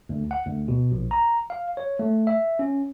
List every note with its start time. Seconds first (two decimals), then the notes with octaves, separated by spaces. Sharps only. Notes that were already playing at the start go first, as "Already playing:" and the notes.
0.09 D2
0.31 F#5
0.46 D2
0.68 B2
0.92 A#1
1.11 A#5
1.50 F5
1.77 C#5
1.99 A3
2.27 E5
2.59 C#4